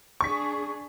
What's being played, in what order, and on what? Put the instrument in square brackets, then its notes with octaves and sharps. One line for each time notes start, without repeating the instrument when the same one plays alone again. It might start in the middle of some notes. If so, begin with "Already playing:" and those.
[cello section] D4 G#4 [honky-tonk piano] C#6 B6